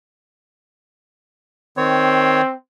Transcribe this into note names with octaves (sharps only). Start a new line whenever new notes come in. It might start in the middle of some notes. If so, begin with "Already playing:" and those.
D#3 C4 C#5